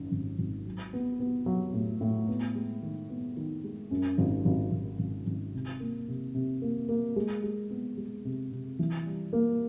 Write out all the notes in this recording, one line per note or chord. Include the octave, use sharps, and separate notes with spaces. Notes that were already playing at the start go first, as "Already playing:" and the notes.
Already playing: G#1 F#2
G#1
G#1
F#3
B3
B3
F#3
A2
A2
B3
G#3
D#3
B3
D#3
G#3
F#2
G#1
G#1
G#1
G#1
G#1
C3
A#3
C3
C3
A#3
A#3
G#3
G#3
B3
G#3
C3
C3
E3
G3
A#3